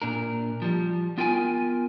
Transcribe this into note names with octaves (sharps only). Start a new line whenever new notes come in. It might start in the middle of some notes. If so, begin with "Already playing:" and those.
A#2 D4 A#4
F3 G3
B3 F4 A#4 G5 G#5